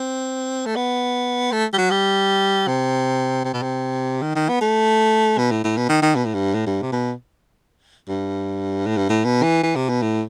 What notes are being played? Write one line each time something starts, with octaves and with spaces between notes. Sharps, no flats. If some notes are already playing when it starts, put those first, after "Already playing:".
Already playing: C4
A3
B3
A3
G3
F#3
G3
C3
C3
B2
C3
D#3
D#3
B3
A3
B2
A2
A2
B2
D#3
D#3
B2
A2
G2
A2
G2
C3
B2
G2
A2
G2
A2
B2
E3
E3
C3
B2
A2